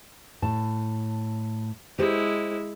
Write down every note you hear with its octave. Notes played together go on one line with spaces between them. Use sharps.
A2 A5
G#3 E4 G4 C5